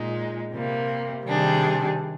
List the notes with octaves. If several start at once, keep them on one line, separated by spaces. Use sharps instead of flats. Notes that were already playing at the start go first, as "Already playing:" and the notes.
Already playing: A#2 G#3 D#4
C3 G3 A#3
C3 D#3 G3 D4 G#4